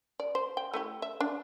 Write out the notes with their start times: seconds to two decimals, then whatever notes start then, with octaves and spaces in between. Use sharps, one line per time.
0.20 D5
0.35 C5
0.57 G5
0.74 A3 E4 G4
1.02 E5
1.21 D4